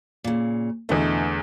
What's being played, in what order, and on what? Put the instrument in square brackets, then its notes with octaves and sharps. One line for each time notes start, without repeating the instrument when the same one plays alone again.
[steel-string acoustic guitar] A#2 C#3
[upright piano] E2 D3 A3 [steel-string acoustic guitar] B2 C5